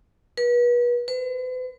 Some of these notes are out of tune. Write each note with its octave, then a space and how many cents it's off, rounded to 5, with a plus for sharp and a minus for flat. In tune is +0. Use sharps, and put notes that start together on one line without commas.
B4 -35
B4 +45